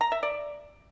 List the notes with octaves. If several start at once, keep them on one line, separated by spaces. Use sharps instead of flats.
A#5
E5
D5